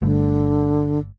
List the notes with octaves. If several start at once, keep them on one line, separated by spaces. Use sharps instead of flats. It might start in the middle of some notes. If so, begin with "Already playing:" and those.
G1 G2 D3 A3